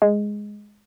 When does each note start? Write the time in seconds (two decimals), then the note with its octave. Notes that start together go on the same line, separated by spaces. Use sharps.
0.02 G#3